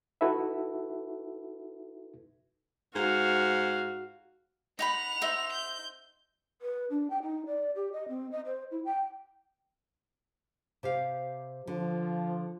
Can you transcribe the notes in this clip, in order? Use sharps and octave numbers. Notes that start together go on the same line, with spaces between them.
D#4 E4 F#4 A4 B4 E5
G#2 F#4 F5
D#4 F#5 G5 B5 F7
D#4 C5 E5
G6
B4
D4
G5
D#4
D5
G4
D#5
C4
D#5
C5
E4
G5
C3 G4 F5
D3 F3